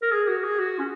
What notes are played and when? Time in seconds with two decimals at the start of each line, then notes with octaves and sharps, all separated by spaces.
0.02 A#4
0.12 G#4
0.28 F#4
0.43 G#4
0.59 F#4
0.79 C#4